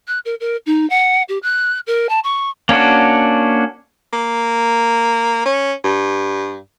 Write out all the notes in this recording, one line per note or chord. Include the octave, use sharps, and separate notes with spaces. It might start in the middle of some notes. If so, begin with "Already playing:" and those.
F#6
A#4
A#4
D#4
F#5
G4
F#6
A#4
A5
C#6
A#3 C#4 D4 F#4
A#3
C#4
G2